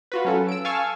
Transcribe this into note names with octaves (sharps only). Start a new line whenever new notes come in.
F4 F#4 B4
F#3 C#4 A4
E6 D7
F5 G#5 A5 C#6 E6 F6